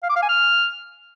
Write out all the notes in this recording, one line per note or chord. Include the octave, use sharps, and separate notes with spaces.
F5
D6
F5
G#5
F6